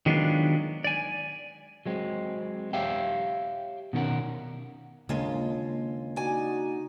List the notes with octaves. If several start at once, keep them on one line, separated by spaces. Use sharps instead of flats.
D#3 F#3 G#3 B3 D4 F4
D5 G#5
F#3 G#3 C4
G4 C#5 E5 F5 G5
B2 D#3 C#4 F4 A#4 F#5
D#2 C#3 G#3 A#3 D4 F4
D#4 F#4 D5 G#5